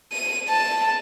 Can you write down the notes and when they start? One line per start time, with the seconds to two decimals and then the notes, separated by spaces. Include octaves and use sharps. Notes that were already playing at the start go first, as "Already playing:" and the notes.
0.13 D#7
0.49 A5